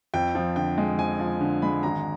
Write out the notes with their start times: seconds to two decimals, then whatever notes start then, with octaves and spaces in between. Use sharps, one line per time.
0.14 F2 G5
0.35 F3
0.56 D3 G5
0.78 G#3
0.98 F2 G#5
1.20 F3
1.41 D3
1.62 G#3 B5
1.83 G#1 A#5